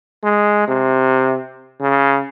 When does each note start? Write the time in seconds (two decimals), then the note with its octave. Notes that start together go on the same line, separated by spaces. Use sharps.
0.23 G#3
0.68 C3
1.80 C#3